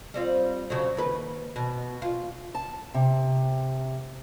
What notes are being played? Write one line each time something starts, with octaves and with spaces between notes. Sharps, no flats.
G3 C4 F4
C#3 F3 F#3
D#2 B4
B2
F4
A5
C3